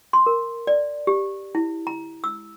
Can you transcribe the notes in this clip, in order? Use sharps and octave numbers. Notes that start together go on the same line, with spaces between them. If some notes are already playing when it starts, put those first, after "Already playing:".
C6
A#4
D5
G4
E4
A#5
E6